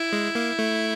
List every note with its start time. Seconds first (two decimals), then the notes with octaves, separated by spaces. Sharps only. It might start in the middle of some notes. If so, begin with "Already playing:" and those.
Already playing: E4
0.13 G#3
0.35 A#3
0.59 A3